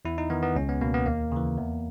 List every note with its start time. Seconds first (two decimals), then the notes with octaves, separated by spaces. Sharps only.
0.05 E2 E4
0.18 D#4
0.30 D#3 B3
0.43 B3
0.56 C#2 C#4
0.69 B3
0.81 B2 A#3
0.94 B3
1.06 D#2 A#3
1.32 C#3 E3
1.57 E2